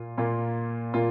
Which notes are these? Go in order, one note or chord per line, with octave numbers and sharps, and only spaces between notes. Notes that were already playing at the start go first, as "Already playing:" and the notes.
Already playing: A#2 A#3 F4
A#2 A#3 F4
A#2 A#3 F4